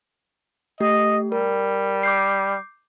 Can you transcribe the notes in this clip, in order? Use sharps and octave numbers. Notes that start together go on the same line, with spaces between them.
A3 G4 D#5
G3 A#4
D6 G6 C7